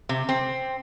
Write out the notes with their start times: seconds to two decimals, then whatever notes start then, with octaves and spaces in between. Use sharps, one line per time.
0.09 C3
0.29 C4